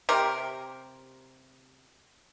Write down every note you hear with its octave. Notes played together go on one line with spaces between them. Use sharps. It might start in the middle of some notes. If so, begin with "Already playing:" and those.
C3 G4 A#4